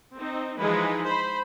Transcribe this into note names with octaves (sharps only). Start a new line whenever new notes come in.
C4 D#4
E3 F3 G#3 D#4 G#4 B4
C5 B5